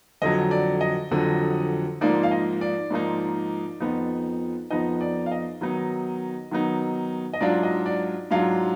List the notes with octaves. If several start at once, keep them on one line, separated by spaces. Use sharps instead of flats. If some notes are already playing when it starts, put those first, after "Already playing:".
F2 D3 F#3 D#5
D5
D#5
F2 D3 F#3
G#2 F3 A#3 D#4 D5
F5
D#5
D5
G#2 F3 A#3 D#4
F2 F3 B3 D#4
F2 F3 B3 D#4 D#5
D5
F5
D#5
D#3 F#3 B3 D#4
D#3 F#3 B3 D#4
D#5
G#2 F#3 D4 F4 D5
D#5
D5
G#2 F#3 D4 F4 F5